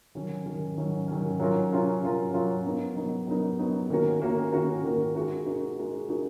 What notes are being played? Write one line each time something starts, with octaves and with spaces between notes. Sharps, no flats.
D#3 F#3 C#4
D#3 F#3 C#4
D#3 F#3 C#4
D#3 F#3 C#4
F#3 C#4 F4 A#4
F#3 C#4 F4 A#4
F#3 C#4 F4 A#4
F#3 C#4 F4 A#4
F#3 B3 D#4 A#4
F#3 B3 D#4 A#4
F#3 B3 D#4 A#4
F#3 B3 D#4 A#4
D#3 A#3 C#4 F#4 A#4
D#3 A#3 C#4 F#4 A#4
D#3 A#3 C#4 F#4 A#4
D#3 A#3 C#4 F#4 A#4
G#3 D#4 F#4 A#4
G#3 D#4 F#4 A#4
G#3 D#4 F#4 A#4
G#3 D#4 F#4 A#4